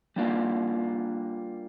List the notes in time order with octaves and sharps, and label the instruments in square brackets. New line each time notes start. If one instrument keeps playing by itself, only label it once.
[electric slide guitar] G3 A#3 D4 F4